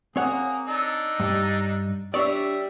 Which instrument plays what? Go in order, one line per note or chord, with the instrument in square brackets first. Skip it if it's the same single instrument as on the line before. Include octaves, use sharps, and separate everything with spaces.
[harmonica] A#3 G#4 [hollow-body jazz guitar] C4 C#5 F#5
[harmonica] D4 D#4 A4
[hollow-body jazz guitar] G2
[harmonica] G3 E5 [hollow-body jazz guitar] D4 C#5 D5